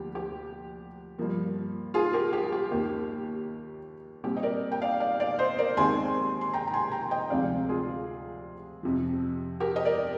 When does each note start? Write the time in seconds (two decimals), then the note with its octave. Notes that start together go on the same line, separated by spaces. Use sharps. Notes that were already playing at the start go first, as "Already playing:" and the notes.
Already playing: D2 F3 A#3 G4
0.15 G4
1.18 G2 F3 A#3
1.94 F4 G#4
2.13 G4 A#4
2.33 G4
2.52 G4
2.72 D#2 D#3 A#3 G4
4.24 A#2 G3 C4 G4
4.37 D#5
4.43 A#4 D5
4.72 G5
4.82 D5 F5
5.00 D5 F5
5.20 D5 F5
5.39 C5 D#5
5.58 A#4 D5
5.77 D#2 D#3 G#3 C4 G#5 C6
6.41 C6
6.54 G5 A#5
6.67 A#5
6.74 G#5 C6
6.92 G5 A#5
7.11 D#5 G5
7.30 D2 C3 F3 G#3 C4 D5 F5
7.69 F4 G#4
8.83 F2 C3 F3
9.60 G4 A#4
9.76 D#5
9.85 A#4 D5